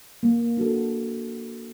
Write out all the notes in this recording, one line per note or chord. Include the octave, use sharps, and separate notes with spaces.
A#3
D4 F#4 A4